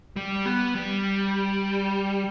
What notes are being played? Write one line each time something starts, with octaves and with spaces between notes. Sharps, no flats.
G3
B3
G3